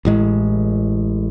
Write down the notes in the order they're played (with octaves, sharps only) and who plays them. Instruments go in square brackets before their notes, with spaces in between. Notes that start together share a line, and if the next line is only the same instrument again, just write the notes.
[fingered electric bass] A1 A2 G#3